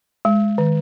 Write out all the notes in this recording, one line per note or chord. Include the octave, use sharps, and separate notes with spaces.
G#3
D#3